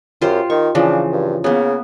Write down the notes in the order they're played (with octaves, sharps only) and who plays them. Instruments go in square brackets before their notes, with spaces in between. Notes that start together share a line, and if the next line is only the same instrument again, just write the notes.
[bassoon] F#2 [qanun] F4 G4 C5
[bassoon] D#3 [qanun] C#6
[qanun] C#3 E3 F3 [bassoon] D4
[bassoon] G2
[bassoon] C#3 [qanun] A#3 B3